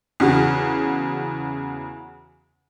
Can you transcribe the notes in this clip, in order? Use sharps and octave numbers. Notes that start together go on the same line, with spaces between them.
E2 C#3 F#4